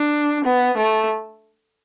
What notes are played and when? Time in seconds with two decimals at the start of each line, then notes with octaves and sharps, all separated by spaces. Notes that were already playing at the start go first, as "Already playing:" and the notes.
Already playing: D4
0.44 B3
0.77 A3